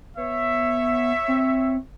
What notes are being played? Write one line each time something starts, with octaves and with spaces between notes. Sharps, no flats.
B3 C#5 E5
C4